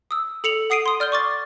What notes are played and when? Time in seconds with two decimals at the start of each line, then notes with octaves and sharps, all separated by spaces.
0.11 D#6 E6
0.44 A4 C#7 F7 F#7
0.70 F#5 D#6 C7 D7 D#7
0.86 C6 D#6
1.00 D5 F6 G6 G7
1.12 C#6 D6 A6